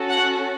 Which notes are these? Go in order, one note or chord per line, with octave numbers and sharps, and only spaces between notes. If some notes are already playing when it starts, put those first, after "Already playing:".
Already playing: C#4 F#4 A4
F#5